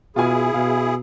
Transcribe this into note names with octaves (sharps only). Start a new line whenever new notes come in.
B2 E4 F4 G#4 G#5
B2 F5